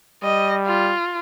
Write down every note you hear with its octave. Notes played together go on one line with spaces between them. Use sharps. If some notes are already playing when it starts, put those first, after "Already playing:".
G3 D#5
F4